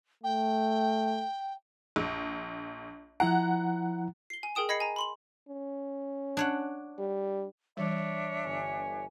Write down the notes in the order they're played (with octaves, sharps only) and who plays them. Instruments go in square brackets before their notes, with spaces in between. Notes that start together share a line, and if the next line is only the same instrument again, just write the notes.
[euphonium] A3 [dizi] G5
[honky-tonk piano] A#1
[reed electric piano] F3 E4 A#5 [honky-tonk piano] F#5
[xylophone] C7 G7
G#5
G#4 A#4 G5 D#6 E7
D#5 B5 G#6 A#6 C7 C#7
G#5 A#5
B5 C6 F#7
[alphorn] C#4
[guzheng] D4 C#5 F#5
[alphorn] G3
[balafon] E3 G3 [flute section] D4 C#5 E5
[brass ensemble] G1 G#5